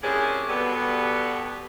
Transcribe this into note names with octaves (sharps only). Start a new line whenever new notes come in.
C3 E3 A#3 C#4 D4 G#4
G2 B2 D3 G3 B3